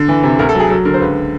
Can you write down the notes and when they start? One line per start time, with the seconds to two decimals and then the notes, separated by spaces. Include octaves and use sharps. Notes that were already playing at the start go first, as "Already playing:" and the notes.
Already playing: D3
0.08 E3
0.23 C3
0.39 D2 A#4
0.49 A4
0.55 F#3 G#4
0.70 F#3 A4
0.85 D3 A#4
0.94 C5
1.00 C#2 B4